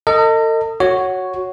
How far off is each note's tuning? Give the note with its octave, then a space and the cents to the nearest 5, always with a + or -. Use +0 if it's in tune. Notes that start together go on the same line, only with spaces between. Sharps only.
A4 +45 D#5 +0
F#4 +0 C#5 +0